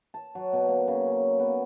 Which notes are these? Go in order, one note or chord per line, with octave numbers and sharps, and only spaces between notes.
A5
F#3
B2
A#3
C#3
C#4
B3